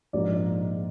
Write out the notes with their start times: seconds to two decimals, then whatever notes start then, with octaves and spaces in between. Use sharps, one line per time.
0.13 A#1 G#2 F3 A#3 D5